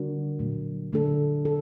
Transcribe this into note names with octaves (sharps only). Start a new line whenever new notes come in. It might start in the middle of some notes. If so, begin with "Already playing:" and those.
Already playing: D3 G3 D4 F#4 A#4
A#2 F#3 A3
D3 A3 D4 A4
A4